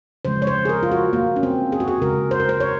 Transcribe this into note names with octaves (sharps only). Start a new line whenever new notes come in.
C#3 F3 G#3 C5
C#5
C5
G#4
A#4
F4
F#4
A#3
C#4
C4
G#4
F#4
G#4
C#3 G#3 A#4
C5
A#4
C5
C#5